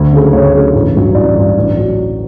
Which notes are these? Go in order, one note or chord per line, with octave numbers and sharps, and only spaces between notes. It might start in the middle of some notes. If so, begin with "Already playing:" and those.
Already playing: D2
C#3 F#3 A3
D2 C#5
C#3 F#3 A3
A1
G2 F#3
A1 D5
G2 F#3
A1
F#3